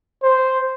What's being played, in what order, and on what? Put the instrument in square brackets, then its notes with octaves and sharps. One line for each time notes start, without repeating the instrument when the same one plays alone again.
[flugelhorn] C5